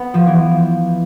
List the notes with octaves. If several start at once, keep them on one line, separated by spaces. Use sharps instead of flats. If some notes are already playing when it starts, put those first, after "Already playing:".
Already playing: B3
F3
E3